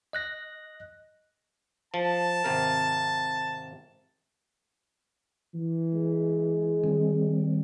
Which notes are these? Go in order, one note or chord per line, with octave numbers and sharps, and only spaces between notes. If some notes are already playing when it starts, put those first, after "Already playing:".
D#5 F#6 A#6
F3 A5
G#1 C3 A#4
E3
G#3
D#3 G3 C4